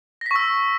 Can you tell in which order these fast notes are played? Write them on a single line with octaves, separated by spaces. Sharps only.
A#6 B6 C#6 E6